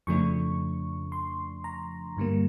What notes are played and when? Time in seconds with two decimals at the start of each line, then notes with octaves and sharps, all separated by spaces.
0.07 F2 C#3 F3 A3 D4 C#6
1.12 C6
1.64 A#5
2.17 G2 D3 G3 A#3